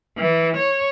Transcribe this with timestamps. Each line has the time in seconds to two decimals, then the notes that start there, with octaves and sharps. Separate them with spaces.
0.18 E3
0.57 C#5